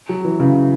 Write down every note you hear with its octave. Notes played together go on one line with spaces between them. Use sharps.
F#3
E3
C#3